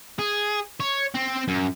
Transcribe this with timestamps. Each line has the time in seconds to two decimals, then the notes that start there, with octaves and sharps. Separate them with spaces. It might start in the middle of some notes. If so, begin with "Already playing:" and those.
0.19 G#4
0.80 C#5
1.14 C4
1.48 F#2